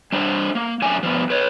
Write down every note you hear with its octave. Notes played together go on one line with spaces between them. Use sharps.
G3 D4 C5
A#3
F#2 A3 D4 G#5
F3 G3 B3
B4 C#5